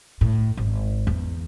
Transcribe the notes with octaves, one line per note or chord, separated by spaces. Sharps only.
A2
G#1
E2